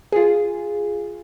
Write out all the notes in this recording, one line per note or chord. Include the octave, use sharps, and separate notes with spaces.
F4 G#4